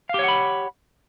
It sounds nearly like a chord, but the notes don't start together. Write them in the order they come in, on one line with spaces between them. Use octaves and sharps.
F5 G4 C#5 F#5 B5